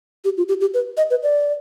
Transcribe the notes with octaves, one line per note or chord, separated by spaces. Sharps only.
G4
F4
G4
G4
B4
D#5
B4
D5